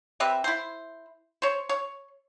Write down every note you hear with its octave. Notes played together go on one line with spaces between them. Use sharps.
C4 G4 B4 E5
E4 C5
C5 C#5
C#5